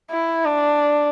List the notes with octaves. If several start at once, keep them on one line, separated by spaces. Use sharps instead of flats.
E4
D4